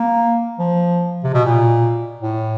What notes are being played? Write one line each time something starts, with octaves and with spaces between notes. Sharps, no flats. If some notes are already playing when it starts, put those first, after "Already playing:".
Already playing: A#3
F3
C3
B2
A#2
A2